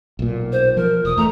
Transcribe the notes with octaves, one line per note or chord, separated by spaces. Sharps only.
B1 A#2
C5
F3 A#4
E1 D#6
E2 A3 A#5